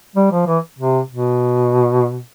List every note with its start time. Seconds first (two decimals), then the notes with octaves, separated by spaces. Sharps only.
0.15 G3
0.31 F3
0.47 E3
0.78 C3
1.10 B2